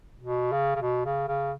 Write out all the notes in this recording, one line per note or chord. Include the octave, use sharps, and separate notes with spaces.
B2
C#3
C#3
B2
C#3
C#3